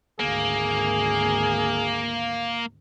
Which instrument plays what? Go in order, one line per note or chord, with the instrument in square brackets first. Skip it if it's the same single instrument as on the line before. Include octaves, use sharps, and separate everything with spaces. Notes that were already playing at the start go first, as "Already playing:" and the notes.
[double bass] G#1 D2 [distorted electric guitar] A#3 [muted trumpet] G#4